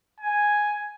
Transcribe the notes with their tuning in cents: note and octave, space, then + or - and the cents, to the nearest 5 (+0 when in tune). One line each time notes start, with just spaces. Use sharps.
G#5 +0